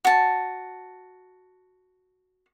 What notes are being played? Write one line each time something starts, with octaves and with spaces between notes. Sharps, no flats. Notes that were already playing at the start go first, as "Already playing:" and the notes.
F#4 A5